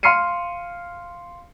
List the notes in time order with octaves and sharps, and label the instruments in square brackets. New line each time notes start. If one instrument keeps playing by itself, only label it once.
[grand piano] F5 C6 F6 C7 C#7 D#7